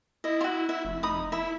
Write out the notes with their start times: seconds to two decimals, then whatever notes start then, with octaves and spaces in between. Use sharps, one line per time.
0.24 E4 D#5
0.41 F4 F#4
0.69 E4 E5
0.85 F1
1.03 D#4 B5 D#6
1.32 E4 E5 B5